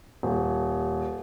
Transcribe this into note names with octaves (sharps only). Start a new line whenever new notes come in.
D#1